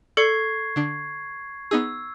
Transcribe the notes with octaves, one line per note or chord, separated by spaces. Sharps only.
A4 D5 C#6 G#6 C7 C#7
D3 D4
B3 D#4 G#4 E6